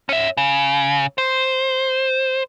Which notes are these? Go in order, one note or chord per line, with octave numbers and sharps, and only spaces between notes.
C#4 E5
C#3
C5